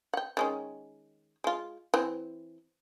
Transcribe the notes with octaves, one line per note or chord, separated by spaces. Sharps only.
F#5 G5
D#3 G#3 C#4
G#3 F4
E3 C4